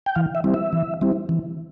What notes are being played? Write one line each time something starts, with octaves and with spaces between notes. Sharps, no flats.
G5
E3 F5
E5
G3 C4 E4
E5
E3
G3 C4 E4
E3